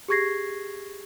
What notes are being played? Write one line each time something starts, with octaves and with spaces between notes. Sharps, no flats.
G4 G#4 C#6 G#6 A#6 C7